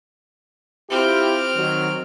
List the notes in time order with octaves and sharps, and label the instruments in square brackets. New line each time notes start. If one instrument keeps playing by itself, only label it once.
[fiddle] C4 F6 [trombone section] E4 F4 G4
[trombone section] D#3 F#3